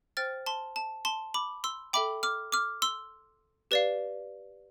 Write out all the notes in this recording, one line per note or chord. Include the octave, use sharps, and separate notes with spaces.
C5 G5 F6 A6
A5 C6
A5
A5 C6
B5 D6
C6 E6
A4 E5 G5 B5 D6
D6 F6
D6 F6
C6 E6
G4 B4 D5 F5